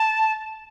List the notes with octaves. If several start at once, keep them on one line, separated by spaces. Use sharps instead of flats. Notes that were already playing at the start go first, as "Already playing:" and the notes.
Already playing: A5